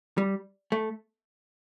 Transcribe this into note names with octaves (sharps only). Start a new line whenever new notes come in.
G3
A3